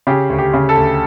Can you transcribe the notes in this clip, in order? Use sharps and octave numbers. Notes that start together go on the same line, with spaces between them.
C#3 G4
D2
G4
C#3
A4
D2